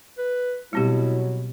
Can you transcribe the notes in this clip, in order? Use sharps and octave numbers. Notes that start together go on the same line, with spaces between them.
B4
B2 F#3 G3 C4 E4 G4